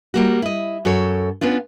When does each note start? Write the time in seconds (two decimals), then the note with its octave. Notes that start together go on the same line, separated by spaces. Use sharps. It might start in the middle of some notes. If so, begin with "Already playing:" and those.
0.14 G3 A#3 F#4
0.42 E4 D#5
0.85 F#2 F#4 A4 C#5
1.41 B3 C#4 D4 F4